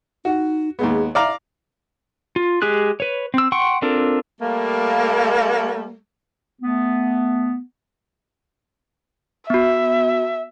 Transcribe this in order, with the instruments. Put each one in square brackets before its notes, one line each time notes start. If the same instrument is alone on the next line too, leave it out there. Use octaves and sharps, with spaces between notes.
[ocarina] D#4 [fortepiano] F#4
[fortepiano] D#2 G#3 B3 [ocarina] G#4
[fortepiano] D5 F5 A#5 [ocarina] E5
[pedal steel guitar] F4
G#3 G4 G#4 F#6
B4 C#5
C4 E6
F#5 G5 C6 C#6
C4 D4 F4 A4 A#4
[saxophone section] G3 A3 A#3
[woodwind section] A3 B3
[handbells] B3 F#4 [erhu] E5